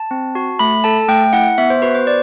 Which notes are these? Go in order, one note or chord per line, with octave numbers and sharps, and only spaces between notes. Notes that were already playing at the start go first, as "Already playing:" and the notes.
Already playing: A5
C4
F#4
A3 B5
A4 A5
A3 G5
E4 F#5
B3 E5
C5
F#4 B4
C5
B3 D5